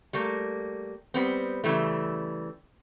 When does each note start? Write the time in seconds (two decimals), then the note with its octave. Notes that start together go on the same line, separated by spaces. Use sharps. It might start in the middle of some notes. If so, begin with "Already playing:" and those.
0.13 G3 A3 A#3
1.14 G3 B3 C4
1.64 C#3 E3 G3 A3